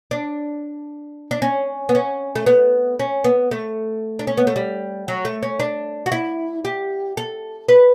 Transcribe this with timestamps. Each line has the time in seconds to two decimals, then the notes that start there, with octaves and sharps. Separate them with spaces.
0.11 D4
1.31 D4
1.42 C#4
1.89 B3
1.95 C#4
2.36 A3
2.46 B3
3.00 C#4
3.24 B3
3.51 A3
4.19 D4
4.27 C#4
4.37 B3
4.47 A3
4.56 G3
5.08 F#3
5.25 A3
5.43 C#4
5.60 D4
6.06 F#4
6.12 E4
6.65 G4
7.17 A4
7.69 B4